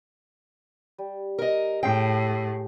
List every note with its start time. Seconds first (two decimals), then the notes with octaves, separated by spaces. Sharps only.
0.98 G3
1.38 A#4 D#5
1.83 A2 G4 G#4 G5